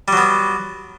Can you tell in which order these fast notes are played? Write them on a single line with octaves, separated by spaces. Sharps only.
G3 F#3 B3